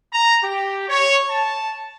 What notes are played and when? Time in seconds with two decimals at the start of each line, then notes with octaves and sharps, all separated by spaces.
0.12 A#5
0.42 G4
0.89 C#5
1.30 A5